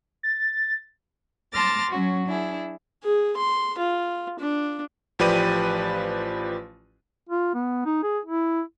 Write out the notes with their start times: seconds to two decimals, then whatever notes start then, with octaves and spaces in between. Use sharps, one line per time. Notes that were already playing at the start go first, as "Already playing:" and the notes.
0.23 A6
1.52 A5 C6 D6 F6 A6 A#6
1.91 F#3 C#4 F#4
2.27 D4 E4 G#4
3.04 G#4
3.37 C6
3.78 F4
4.39 D4
5.19 A1 F3 G4 B4 D5 D#7
7.30 F4
7.54 B3
7.86 D#4
8.03 G#4
8.25 E4